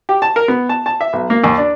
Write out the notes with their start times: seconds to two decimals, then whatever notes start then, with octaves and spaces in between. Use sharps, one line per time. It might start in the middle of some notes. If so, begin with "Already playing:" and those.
0.09 G4
0.22 A5
0.36 A#4
0.48 B3
0.69 A5
0.86 A5
1.01 E5
1.13 B1
1.30 A#3
1.44 D#2
1.58 D4